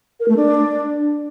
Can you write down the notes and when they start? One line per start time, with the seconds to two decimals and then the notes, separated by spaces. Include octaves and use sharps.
0.20 A#4
0.28 A3
0.37 D4